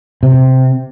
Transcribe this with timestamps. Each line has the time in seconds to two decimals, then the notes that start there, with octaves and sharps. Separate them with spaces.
0.23 C3